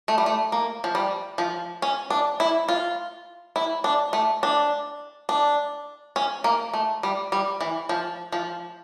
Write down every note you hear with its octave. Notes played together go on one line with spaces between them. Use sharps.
A3
G3
A3
A#3
F3
G3
F3
C#4
D4
E4
F4
E4
D4
A3
D4
D4
C#4
A#3
A3
G3
G3
E3
F3
F3